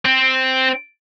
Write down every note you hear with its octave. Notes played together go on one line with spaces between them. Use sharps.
C4